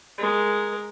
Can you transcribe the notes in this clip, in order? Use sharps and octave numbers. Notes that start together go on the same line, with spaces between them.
G#3 A#4